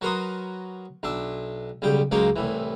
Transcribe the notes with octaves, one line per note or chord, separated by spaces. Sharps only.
F#3 F#4 A#4 B4 C6 D#6
B1 D4 E5
B1 C#3 G3 G5
C#2 F#3 G#3 A#3 C#5 G5
C2 A2 E3